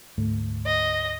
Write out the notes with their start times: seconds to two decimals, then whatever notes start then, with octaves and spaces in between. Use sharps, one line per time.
0.18 D2 G#2 A3
0.66 D#5